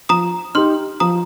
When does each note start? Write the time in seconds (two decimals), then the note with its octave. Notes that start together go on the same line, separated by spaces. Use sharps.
0.09 F3 A#5 D#6
0.55 D#4 G4 C6 F6
1.00 F3 A#5 D#6